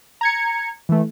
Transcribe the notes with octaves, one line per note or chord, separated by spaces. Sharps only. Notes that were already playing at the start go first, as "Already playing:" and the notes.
A#5 G#6 C#7
E3 A3